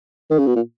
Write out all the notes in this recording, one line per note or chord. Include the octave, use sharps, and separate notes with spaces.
D#3
C#3
B2
A#2